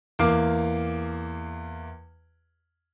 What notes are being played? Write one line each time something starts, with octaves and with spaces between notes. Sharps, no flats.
E2 A#3 F5 D6